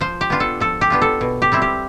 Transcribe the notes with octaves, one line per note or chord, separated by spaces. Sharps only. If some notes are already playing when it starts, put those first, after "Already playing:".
F3 C5
G4
B3 D4 F4
A4
F3 A4
G4
B3 D4 F4
A4
B2
G4
G3 C4 E4
G4